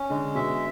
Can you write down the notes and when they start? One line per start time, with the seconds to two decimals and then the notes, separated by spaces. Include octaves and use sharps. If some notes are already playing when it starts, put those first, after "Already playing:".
Already playing: C#4
0.10 D3 G#3
0.35 B2 E5